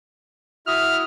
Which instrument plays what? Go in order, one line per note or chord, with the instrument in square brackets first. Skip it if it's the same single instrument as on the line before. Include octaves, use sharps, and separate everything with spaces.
[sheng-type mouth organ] E4 F#4 E5 [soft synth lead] D#6 [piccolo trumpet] F6